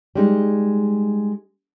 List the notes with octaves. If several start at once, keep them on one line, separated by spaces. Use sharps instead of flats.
G3 G#3 D#4